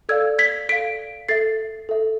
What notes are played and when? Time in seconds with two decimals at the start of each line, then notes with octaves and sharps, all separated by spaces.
0.09 A4 D5 F5 E6 G#6
0.39 G#6 B6
0.69 A4 D5 F5 B6 D7
1.29 A4 E5 A6 C7
1.89 A4 E5